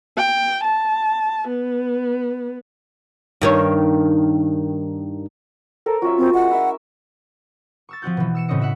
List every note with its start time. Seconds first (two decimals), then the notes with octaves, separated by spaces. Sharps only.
0.17 G5
0.63 A5
1.48 B3
3.41 G2 D#3 C#5
5.86 A4 A#4 C5 A#5
6.02 F#3 C#4 F4 E5
6.18 C4
6.34 G#3 F#5
6.51 E4 A#4 E5
7.89 C#6 E6 A6
8.02 F3 C4 F#4 G6
8.17 B2 E3
8.35 E6 C#7 E7
8.48 A2 C#3 C4 C#4 D#5 C#7
8.59 F#4 E5 F#5